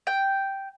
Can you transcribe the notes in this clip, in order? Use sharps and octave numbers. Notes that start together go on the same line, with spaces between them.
G5